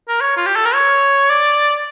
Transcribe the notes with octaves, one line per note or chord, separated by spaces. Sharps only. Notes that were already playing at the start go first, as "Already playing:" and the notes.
A#4
C#5
F4
G4
A4
A#4
C#5
D5